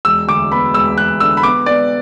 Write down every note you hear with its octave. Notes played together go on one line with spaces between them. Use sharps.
E1 E6
D2 D6
B3 B5
E1 E6
E1 F#6
D3 E6
B5
B3 D6
B3 D5